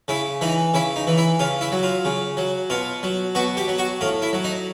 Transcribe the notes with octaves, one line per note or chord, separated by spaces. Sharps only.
C#3 E4
E3 D#4
C#3 E4
D#4
E3
E4
C#3 F4
E4
F#3
F4
C#3
F#3
B2 F4
F#3
B2 F#4
G4
F#3
F#4
A2 F4
E4
F#3
D#4